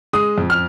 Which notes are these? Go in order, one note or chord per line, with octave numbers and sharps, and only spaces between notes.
G#3 D#6
F2
F6